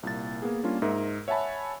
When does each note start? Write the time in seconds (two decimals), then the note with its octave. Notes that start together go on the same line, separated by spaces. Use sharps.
0.03 C2 A#2 A6
0.42 A#3 B3 G#4
0.63 G3 A#3 C#4 D4 F4
0.82 G#2 D#4 A#4 E5
1.28 C#5 E5 F#5 G#5 A5 B5